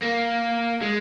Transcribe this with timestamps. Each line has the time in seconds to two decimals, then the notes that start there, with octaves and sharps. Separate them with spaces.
0.03 A#3
0.82 G#3